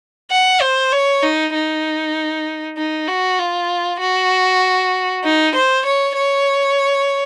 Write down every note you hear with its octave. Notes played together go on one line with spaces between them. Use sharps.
F#5
C5
C#5
D#4
D#4
D#4
F#4
F4
F#4
D#4
C5
C#5
C#5